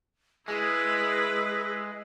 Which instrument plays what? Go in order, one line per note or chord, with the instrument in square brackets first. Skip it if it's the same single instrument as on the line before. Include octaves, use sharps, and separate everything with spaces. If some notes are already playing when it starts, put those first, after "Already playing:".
[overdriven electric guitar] G#3 [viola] E4 B4 [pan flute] G#4